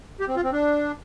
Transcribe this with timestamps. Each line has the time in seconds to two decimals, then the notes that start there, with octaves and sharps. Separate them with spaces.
0.20 G4
0.28 C4
0.36 F4
0.44 C4
0.52 D4